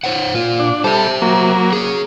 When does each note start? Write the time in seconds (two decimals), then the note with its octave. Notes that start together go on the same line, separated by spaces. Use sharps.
0.04 C5 C#5 F#5
0.34 A#2 A#3 F4
0.60 D4
0.84 G3 A4 C5 E5
1.22 F#3 A#3
1.73 G#4 C#5